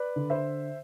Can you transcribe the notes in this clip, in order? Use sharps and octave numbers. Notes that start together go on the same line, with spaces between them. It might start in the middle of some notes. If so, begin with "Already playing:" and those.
Already playing: B4 D5
D3
C5 E5